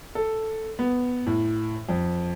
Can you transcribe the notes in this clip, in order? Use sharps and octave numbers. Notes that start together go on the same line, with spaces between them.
A4
B3
A2
F2